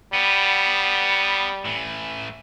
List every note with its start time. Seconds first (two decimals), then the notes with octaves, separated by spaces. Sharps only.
0.14 G3 B3
1.65 A2 E3